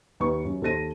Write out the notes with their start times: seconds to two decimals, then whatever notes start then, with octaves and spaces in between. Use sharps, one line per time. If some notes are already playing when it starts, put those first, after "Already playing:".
0.20 D#2 B4 C#6
0.45 F#2
0.62 D#2 A4 C5 A#6 D#7